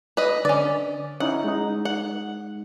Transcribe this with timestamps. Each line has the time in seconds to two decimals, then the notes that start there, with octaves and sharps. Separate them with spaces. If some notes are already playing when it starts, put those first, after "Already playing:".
0.17 B4 D#5
0.45 D3 C#4 D5
1.20 C#4 D#4 E4 F#5
1.44 G#3 D#4
1.85 F#5